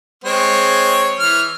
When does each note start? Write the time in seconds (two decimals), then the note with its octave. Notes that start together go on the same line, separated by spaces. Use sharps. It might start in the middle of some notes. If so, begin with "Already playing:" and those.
0.24 G#3 C4 C#5
1.20 E3 F6